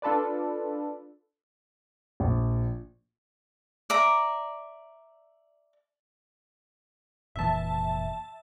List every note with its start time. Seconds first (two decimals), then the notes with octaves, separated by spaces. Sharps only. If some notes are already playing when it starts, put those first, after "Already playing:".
0.02 D4 F4 A4 B4 D5
2.20 A#1
3.90 D5 E5 A#5
7.36 F1 A#2 E3 E5 A5